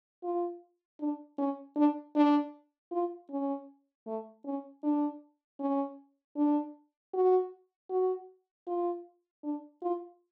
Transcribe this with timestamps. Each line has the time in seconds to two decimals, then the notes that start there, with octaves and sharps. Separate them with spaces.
0.23 F4
1.00 D4
1.38 C#4
1.76 D4
2.16 D4
2.91 F4
3.30 C#4
4.07 A3
4.45 C#4
4.83 D4
5.60 C#4
6.36 D4
7.13 F#4
7.90 F#4
8.67 F4
9.43 D4
9.82 F4